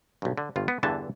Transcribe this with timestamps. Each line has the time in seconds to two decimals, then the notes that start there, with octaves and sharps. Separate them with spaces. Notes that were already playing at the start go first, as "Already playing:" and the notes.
0.22 B1 G2
0.38 D3
0.56 G1 G2 F4
0.68 B3
0.83 E2 G2 D3 E3 A5